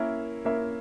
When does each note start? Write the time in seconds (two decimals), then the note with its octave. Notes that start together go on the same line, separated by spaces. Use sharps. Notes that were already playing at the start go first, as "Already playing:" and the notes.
Already playing: A#3 C#4 E4 A#4 E5
0.45 A#3 C#4 E4 A#4 E5